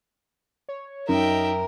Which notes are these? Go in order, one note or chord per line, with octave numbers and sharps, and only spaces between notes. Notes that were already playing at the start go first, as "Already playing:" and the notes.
C#5
F#2 D#4 A#4 E5 G5